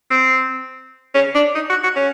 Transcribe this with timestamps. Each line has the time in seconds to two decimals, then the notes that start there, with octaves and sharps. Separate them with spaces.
0.11 C4
1.14 C#4
1.35 D4
1.55 D#4
1.69 F#4
1.83 F#4
1.96 C#4